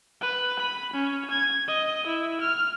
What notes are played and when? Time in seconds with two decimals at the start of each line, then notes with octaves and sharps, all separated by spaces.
0.21 B4
0.59 B5
0.93 C#4
1.31 G#6
1.67 D#5
2.06 E4
2.41 F6